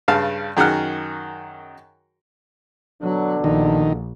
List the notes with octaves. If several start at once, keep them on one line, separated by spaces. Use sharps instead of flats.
G2 C#3 F5 A5
F#2 D#3 F#4 G#4 F#5 F6
B2 D3 F#3 D4
A#1 D#3